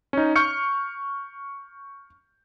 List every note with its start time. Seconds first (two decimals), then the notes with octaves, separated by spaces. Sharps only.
0.13 C#4 D#4
0.36 C#6 F6 G6 C#7